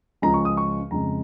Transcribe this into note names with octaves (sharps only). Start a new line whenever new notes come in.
C#2 C#3 F3 G#3 A#5
C#6
D#6
C#6
F2 C#3 G#3 A#5